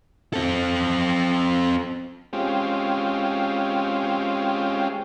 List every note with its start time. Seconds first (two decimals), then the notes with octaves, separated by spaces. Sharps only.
0.33 C4 A4
2.33 G#3 C4 C#4 F4 G4